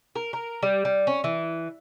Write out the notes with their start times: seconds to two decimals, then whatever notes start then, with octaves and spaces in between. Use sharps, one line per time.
0.15 A#4
0.33 A#4
0.63 G3
0.85 G3
1.07 C#4
1.24 E3